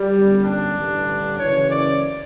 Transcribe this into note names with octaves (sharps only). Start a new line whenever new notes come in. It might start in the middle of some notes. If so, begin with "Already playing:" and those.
Already playing: G3
G1 F#2 D3
D4
A1 G2 D3
F#1 F#2 C#3 E3 C#5
D5